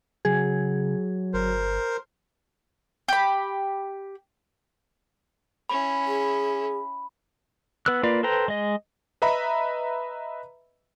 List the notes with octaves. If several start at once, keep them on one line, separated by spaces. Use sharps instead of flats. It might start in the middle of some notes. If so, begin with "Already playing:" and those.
C#3 F#3 G#4
G1 A#4 C5
G4 B5
C#4 E4 B5
G#4
B3 B4 E6 F#6
A#3 F4 B4 D5
A4 B4 C5 G5 A#5
G#3 D#5
B4 D#5 E5 A#5 B5